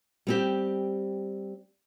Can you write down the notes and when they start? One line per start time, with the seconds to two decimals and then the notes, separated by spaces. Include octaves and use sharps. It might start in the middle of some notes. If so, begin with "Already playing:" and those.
0.27 G3 C4 G4